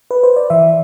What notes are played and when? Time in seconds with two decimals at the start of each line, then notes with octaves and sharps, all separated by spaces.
0.11 B4
0.23 C5
0.36 D5
0.50 E3 E5